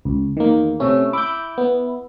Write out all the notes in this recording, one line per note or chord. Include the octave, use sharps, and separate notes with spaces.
C#2
E2 D#3 A#3
C3 A3 C#4
E4 D6 G6
B3